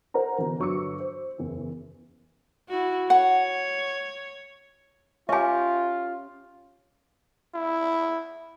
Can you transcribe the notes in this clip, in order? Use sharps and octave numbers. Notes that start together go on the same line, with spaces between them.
A#4 C5 F#5 A#5
B2 D3 E3
G1 F#3 C#6 D6 E6 C#7
C5
F#1 E2
E4 F#4
C#5 F#5
C#4 F4 G4 E5 G#5
E4